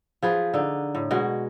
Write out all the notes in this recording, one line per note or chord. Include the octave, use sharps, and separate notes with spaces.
F3 G#4 B4
D3 D#4
A2
B2 G#3 F#4